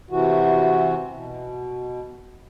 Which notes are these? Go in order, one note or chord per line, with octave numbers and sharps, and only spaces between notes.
C3 E3 F#4
B2